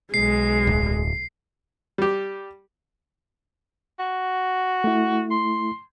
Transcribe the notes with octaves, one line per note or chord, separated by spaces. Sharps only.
B1 G#3 C7
D1
G3 G4
F#4
A3 E4
C6